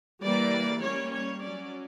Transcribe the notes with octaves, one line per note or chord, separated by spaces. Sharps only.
E3 G3 A#3 D5
G3 A#3 C#4 C#5
C#5
F#3 C#4 D5